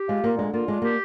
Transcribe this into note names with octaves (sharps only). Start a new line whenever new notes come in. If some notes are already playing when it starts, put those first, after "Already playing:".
Already playing: G4
G#3 F4
A#2 A#3
D3 G#3
A#3 F4
G#3 D4
A#3 G4